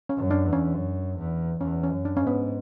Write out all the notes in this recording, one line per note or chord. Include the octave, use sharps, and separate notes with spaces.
C#4
F#2
D4
E2
C#4
F#2
E2
E2 C#4
C#4
F#2
D4
G#2 C#4
B3